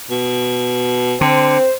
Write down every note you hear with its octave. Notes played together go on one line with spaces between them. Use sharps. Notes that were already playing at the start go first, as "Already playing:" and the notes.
B2
D3 C4 C5